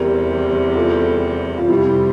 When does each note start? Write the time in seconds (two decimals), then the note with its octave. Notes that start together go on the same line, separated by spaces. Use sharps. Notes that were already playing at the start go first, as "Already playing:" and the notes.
Already playing: E2 C3 G3 G4 A#4
0.75 F4 A4
1.58 F4
1.69 F2 C3 G3 C4 E4 G4